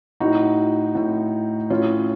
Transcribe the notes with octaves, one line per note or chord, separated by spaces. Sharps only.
A2 D#4 F#4
A2
A2 C#4 F4